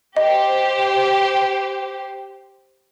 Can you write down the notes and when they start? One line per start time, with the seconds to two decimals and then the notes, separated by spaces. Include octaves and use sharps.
0.17 G4 C5 D#5